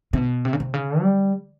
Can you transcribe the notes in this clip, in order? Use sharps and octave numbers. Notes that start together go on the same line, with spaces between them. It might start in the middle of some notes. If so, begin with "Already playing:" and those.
C3
B2
C3
C#3
C3
C#3
G3